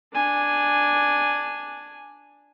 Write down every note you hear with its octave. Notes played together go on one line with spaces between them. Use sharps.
D4 G#5